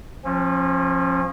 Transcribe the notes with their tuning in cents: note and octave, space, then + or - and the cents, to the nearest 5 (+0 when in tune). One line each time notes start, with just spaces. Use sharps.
F3 +0 C#4 -40